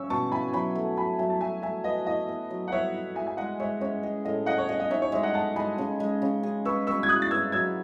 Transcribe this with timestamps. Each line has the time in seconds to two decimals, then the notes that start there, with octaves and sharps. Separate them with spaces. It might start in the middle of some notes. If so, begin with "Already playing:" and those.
Already playing: C#4 C#6 E6
0.10 B2 A5 C#6
0.32 E4 G#5 B5
0.53 F#3 G#5 B5
0.75 A3
0.97 F#3 G#5 B5
1.19 F#3 E5 G#5
1.30 A5
1.41 A3 E5 G#5
1.62 A3 E5 G#5
1.84 B4 D#5
2.07 E4 D#5
2.29 B3
2.50 F#3
2.68 F#5
2.72 B3 C#5 E5
2.94 E4
3.16 G#3 E5 G#5
3.27 G#5
3.37 G#3 D#5 F#5
3.60 G#3 C#5 E5
3.81 C#4 C#5 E5
4.03 G#4 D#5
4.25 A2 D#5
4.46 G#4 D#5 F#5
4.58 C#5
4.69 G#4 D#5
4.80 D#5
4.90 D#4 C#5 E5
5.02 C#5
5.12 G#3 C#5 E5
5.23 D#5 F#5
5.34 A4 F#5 A5
5.56 G#3 G#5 B5
5.78 C#3
6.00 G#3
6.22 C#3
6.43 G#4
6.65 B4 C#6 E6
6.87 B4 C#6 E6
7.03 G#6
7.09 E4 D#6 F#6
7.22 A6
7.31 B4 E6 G#6
7.52 F#3 E6 G#6